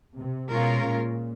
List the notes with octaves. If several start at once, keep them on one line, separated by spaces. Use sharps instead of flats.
C3
B2 G#3 C#4 F4 A#4
A#2